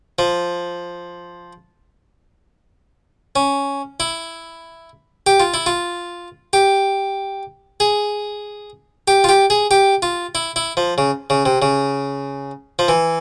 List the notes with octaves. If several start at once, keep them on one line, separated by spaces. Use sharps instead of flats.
F3
C#4
E4
G4
F4
E4
F4
G4
G#4
G4
F4
G4
G#4
G4
F4
E4
E4
F3
C#3
C#3
C3
C#3
F3
E3